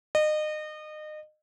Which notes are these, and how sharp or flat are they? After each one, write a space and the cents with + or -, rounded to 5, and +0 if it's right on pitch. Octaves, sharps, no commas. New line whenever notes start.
D#5 -30